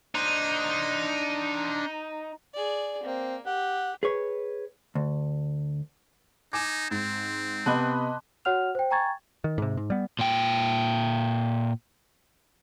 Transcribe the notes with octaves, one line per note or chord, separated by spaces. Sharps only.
D4 D#4 C5
G#4 D5
A#3 C4
G4 F#5
G#4 B4 C#5
D2
D#4 G#5 D6 G#6 E7
G#2 C4
C3 B3 D#5 A5 B5 C6 D6 F#6
F#4 C#5 F#5 F6 F7
C5 G5
G5 G#5 A#5 C#6 G#6 A6
D#3
G#2 C3
G#2
G3 B3
A#2 G5